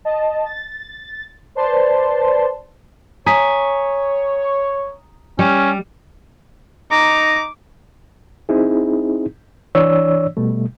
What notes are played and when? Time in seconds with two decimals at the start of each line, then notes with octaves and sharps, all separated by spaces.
0.05 D#5 A5
0.45 A6
1.55 B4 C5 D5 A5 C6
3.26 C#5 G#5 A#5 D#6 B6
5.39 G3 C#4
6.91 D#4 A#5 D6
8.49 C4 D#4 E4 G#4
9.75 E3 D4 C#5 D5 E6
10.37 B2 G3 A3